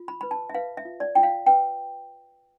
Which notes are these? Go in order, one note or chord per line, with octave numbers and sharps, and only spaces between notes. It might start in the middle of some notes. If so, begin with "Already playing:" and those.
Already playing: F4
B5
B4 B5
A5
E5
B4 F5
E5
F4
D5
F4 G5
F5
B4 G5